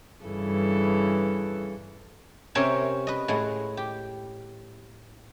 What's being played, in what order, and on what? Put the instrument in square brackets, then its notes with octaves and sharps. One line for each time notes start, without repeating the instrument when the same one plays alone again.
[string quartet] G2 C#3 E3 A4
[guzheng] C3 C#4 A#4 C#5 E5 G5
B4 D#5
A2 G#3 F#5
G4